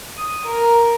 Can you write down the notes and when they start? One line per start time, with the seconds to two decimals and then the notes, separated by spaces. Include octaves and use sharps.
0.16 D#6
0.45 A#4